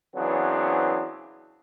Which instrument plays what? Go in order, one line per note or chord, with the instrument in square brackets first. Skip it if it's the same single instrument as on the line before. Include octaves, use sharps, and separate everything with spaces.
[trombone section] C#3 E3 F#3 B3 C4 D4